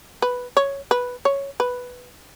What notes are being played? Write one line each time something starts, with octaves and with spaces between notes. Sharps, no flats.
B4
C#5
B4
C#5
B4